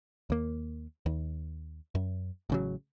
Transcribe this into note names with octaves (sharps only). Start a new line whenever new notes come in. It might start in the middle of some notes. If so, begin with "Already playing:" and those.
D#2 A#3
D#2
F#2
A1 C#3 F#3